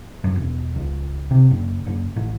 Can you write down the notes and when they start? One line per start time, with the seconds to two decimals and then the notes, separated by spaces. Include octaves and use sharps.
0.24 F#2
0.36 E1
0.76 C#2
1.31 C3
1.51 F#1
1.86 F#1
2.16 A1